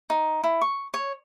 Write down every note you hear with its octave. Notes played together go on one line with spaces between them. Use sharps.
D#4
E4
C#6
C#5